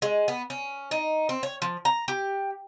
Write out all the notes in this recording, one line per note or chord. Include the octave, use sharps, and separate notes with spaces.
G#3
B3
C#4
D#4
C4
C#5
F3
A#5
G4